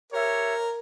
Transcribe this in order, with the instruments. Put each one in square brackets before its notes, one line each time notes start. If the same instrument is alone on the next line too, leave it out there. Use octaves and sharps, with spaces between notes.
[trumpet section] G4 C#5 E5 [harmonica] A#4